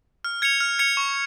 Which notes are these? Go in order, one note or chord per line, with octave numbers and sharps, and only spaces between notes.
F6
G#6 C#7 F7
F6
G#6 C#7 F7
C#6